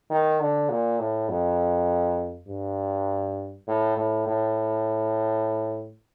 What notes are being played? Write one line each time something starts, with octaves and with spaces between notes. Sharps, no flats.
D#3
D3
A#2
A2
F2
G2
A2
A2
A2